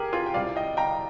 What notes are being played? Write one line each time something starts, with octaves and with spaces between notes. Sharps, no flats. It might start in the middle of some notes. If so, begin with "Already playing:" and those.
Already playing: G4 G#4 A#4
F4 G#4
G5
C2 C3 G3 D5 F5
D#5 G5
G5 A#5